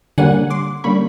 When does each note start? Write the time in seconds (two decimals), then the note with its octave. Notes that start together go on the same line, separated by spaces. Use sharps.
0.18 D3 G3 A#3 C#4 F#5 G#5
0.50 C6 D6
0.84 D3 G3 A#3 C#4 B5 C#6